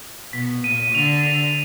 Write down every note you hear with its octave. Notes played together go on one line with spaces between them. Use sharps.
B2 B6
A#2 D#7
D3 F7